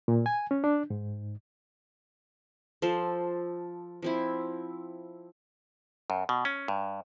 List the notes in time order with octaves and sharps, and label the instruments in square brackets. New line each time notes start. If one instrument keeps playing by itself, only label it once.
[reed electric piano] A#2
G#5
C#4
D4
G#2
[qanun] F3 A4 C5
F3 C4 E4
[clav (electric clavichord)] F#2
B2
C#4
G2